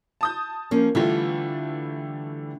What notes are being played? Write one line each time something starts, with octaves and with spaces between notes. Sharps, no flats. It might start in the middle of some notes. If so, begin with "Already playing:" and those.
A5 D#6 G6
F3 A#3 C#4
D3 E3 G3 A3 F4